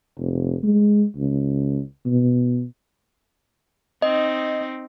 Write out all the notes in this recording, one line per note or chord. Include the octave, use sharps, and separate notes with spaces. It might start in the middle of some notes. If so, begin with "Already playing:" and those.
F1
G#3
C#2
B2
C4 D#4 D#5